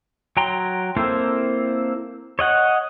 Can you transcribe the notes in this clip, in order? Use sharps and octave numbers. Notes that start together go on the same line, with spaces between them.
F#3 G5 A#5 C6
A#3 C4 E4 A4 C5
C#5 D#5 F#5